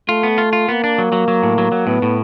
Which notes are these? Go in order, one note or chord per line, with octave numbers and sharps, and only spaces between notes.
A3 F4
B3
F4
F4
A#3 B3
D4
F#3
F#3
F#3
A2
F#3
F#3
A2 B3
A2